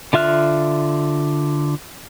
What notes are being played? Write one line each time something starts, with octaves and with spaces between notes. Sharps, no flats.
D3 F4 E5 F6 F#6